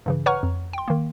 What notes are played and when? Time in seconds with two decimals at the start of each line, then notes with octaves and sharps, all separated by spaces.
0.06 G2 C#3 E3
0.26 B4 C#5 F#5 A#5 C#6 F6
0.43 F2
0.73 G5 C6
0.88 D#3 A#3